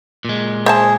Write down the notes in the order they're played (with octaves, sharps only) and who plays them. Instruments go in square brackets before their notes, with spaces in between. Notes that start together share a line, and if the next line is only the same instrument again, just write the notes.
[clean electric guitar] A#2 G#3
[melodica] G#4 [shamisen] C5 E5 A5